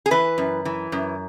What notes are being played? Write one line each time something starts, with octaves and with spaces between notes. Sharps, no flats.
G#4
E3 B4
F#2
E3
F#2